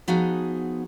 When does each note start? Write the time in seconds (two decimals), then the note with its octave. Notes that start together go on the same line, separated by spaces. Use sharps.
0.08 F3 B3 D#4 F#4 G#4